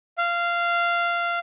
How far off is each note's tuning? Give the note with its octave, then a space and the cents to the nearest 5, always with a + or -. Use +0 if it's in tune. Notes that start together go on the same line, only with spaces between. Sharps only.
F5 -15